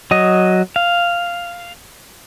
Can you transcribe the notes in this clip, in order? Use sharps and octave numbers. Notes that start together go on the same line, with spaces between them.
F#3 D#5
F5